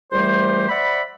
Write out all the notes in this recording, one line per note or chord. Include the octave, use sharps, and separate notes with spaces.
C#2 E3 G3 A3 G4 C5
C5 D5 E5 F#5 B5